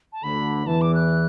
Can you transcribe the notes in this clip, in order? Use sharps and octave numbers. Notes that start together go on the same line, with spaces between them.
A5
D2 D3 B5
E2 E3 A5
D6
F#6